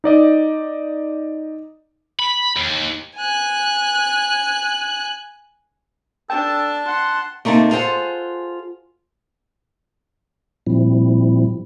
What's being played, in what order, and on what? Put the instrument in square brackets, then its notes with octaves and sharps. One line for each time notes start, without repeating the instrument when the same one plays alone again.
[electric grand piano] D#4 D5 D#5
[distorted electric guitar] B5
D#2
[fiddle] G#5 F#6
[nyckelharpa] D4 [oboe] A4 [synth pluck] G5 [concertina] A5
[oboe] F#5 [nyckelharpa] C6
[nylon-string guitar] C3 A3 A#3 D#4 A5
F4 G#4 A4 B4 C5 F#5
[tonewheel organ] A#2 F3 G3 C4 E4